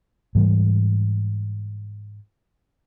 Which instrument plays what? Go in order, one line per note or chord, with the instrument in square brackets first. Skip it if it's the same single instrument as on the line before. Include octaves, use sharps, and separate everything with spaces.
[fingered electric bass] G#2 E3 G3